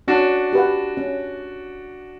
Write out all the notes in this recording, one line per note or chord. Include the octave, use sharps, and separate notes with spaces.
C#4 D4 F#4
G4 B4 F#5
C#4